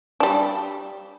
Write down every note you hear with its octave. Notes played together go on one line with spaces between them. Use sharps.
G3 D4